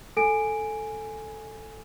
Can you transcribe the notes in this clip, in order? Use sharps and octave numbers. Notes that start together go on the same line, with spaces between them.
A4 G#5 D7